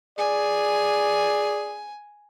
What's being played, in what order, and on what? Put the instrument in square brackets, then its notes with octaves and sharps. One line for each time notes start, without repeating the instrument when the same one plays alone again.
[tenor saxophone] G#4 [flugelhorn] D5 [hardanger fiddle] G#5